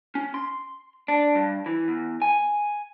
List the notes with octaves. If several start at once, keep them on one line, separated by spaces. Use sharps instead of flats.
C#4
C6
D4
G2
E3
E2
G#5